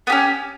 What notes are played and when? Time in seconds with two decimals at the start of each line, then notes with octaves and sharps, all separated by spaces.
0.07 B3
0.10 G4
0.12 C#4